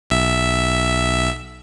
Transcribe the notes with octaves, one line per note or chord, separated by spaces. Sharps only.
B1 E5